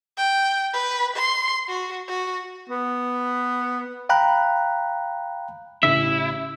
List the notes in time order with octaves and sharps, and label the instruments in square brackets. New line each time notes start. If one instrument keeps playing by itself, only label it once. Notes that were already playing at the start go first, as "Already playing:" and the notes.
[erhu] G5
B4
C6
F#4
F#4
[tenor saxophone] B3
[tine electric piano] F5 G5 A#5 B5 F#6
[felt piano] A1 C#3 [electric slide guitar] E4 [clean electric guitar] E5